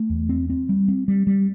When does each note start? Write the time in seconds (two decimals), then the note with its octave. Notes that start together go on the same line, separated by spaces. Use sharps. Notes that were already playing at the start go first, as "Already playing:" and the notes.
Already playing: A3
0.10 E2
0.29 C4
0.50 C4
0.69 G3
0.88 C4
1.08 G3
1.27 G3